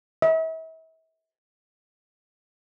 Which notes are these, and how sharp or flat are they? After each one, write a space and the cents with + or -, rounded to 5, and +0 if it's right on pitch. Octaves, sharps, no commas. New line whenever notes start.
E5 -40